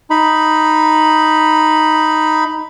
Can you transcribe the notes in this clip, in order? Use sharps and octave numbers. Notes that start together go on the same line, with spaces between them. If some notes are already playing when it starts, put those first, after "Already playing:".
D#4 B5